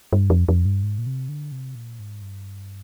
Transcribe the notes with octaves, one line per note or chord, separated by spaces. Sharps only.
G2
F2
F2
G2
G#2
A#2
C3
D3
C3
A#2
G#2
G2